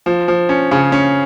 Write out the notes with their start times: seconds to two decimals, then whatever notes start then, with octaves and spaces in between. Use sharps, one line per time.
0.06 F3
0.28 F3
0.49 C#4
0.71 C#3
0.92 C#4